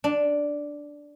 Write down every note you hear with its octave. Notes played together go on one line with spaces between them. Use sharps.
D4